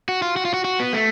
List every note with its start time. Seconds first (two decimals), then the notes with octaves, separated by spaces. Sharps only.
0.09 F#4
0.22 F4
0.37 F#4
0.45 F4
0.54 F#4
0.65 F#4
0.80 B3
0.93 A3